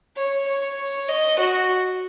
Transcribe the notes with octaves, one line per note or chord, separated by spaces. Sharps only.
C#5
C#5
D#5
F#4